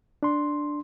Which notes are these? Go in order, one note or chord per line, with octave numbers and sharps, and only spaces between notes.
D4 C6